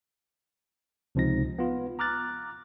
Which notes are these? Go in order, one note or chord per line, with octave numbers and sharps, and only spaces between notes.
C#2 C3 F3 C4 D#4 A#6
B3 F4
A#5 D6 F6 F#6 A6